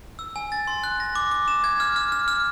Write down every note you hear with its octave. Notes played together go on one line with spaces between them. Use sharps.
E6
G#5
A6
C6
F#6
A#6
D6
D6
E7
G#6
F6
F6
F6
F6